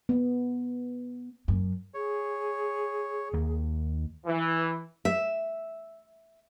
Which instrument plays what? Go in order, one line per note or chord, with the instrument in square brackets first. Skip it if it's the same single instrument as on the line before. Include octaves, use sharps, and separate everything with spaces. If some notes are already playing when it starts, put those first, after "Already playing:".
[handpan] B3
[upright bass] F#2
[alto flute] G#4 [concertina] C#5
[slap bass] D#2 A#3
[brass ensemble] E3
[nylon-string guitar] E5